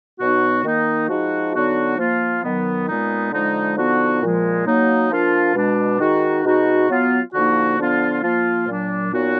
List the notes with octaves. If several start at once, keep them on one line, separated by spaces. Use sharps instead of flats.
B2 F#3 B3 D#4 F#4
D#3 A#3 D#4
F3 G#3 D#4 F#4
D3 F#3 B3 D#4 F#4
F3 A#3 F4
D#3 F#3 B3
A#2 G#3 B3 D#4
D3 F3 G#3 D#4
D3 F3 B3 D#4 F#4
A#2 F3 G#3
F#3 A#3 D#4
F3 A#3 D4 F4
B2 G#3 D4
D#3 G#3 D#4 F#4
B2 G#3 D#4 F#4
F#3 B3 F4
D3 F3 A#3 D#4 F#4
D3 F3 B3 D4 F4
F3 A#3 F4
A#2 F#3 D4
A#2 F#3 B3 D#4 F#4